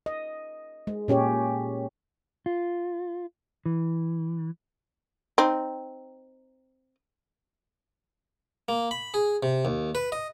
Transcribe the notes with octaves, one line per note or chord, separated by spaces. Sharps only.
D#5
G#3
A#2 C#4 G4 C#5
F4
E3
C4 D#4
A#3
B5
G#4
C3
D#2
B4
D#5